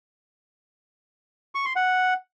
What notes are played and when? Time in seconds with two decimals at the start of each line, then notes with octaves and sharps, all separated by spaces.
1.55 C#6
1.65 C6
1.76 F#5